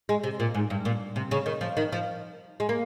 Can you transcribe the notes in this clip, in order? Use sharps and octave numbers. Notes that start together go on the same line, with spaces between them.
G#3
C3
A#2
G#2
G2
A#2
C3
C#3
D#3
F3
D#3
F3
G#3
A#3